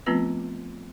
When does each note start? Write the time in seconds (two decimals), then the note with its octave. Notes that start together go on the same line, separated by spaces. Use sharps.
0.06 F3 A3 B3 C4 F4 B4